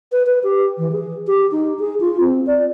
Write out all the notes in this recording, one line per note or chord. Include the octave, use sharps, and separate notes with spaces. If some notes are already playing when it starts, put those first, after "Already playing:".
B4
B4
G4
E3
G#4
G4
D#4
G#4
F4
C4
D5